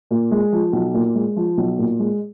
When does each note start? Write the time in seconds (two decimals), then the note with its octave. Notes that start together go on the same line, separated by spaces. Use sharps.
0.11 A#2
0.31 G#3
0.52 F3
0.73 B1
0.94 A#2
1.15 G#3
1.36 F3
1.57 B1
1.78 A#2
1.99 G#3